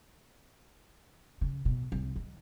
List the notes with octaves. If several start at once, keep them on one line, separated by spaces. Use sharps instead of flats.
C#3
B2
C2
D#3